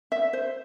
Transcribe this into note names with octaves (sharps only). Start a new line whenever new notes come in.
E5
C5